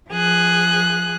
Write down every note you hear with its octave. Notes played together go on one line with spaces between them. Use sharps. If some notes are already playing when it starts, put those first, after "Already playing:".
F3 G#4 F#6